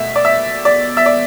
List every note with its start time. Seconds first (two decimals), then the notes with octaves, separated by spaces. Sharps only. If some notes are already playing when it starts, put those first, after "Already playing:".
Already playing: B2 A3 E5
0.16 D5
0.25 E5
0.65 D5
0.97 E5
1.06 D5